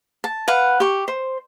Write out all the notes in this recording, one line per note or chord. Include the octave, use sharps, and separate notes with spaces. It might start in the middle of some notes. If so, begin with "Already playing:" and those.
A5
B4 F5 F#5
G4 C#6
C5